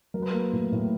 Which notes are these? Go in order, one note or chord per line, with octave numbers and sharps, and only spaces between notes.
F#3 A#4
B4
A#3 A#4
A2
A2